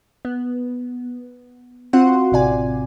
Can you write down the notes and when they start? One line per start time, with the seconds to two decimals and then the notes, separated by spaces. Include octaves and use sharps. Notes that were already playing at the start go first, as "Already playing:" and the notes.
0.25 B3
1.93 C4 F4 F#4 F#5 C6
2.32 A1 C3 D5 G#5